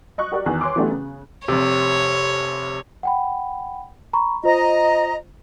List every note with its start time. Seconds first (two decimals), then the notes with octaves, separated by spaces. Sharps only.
0.18 D#5 C#6 F#6
0.32 F#4 G4 A#4 D5 C#6
0.46 E2 D#3 F#6
0.61 C#5 C6 D6
0.76 E3 F#3 A3 B3 D4 G4
0.89 C#3
1.48 F1 C3 C#5
3.03 F#5 G5 B5
4.13 A#5 B5 C#6
4.44 F4 C5 D#5 A#5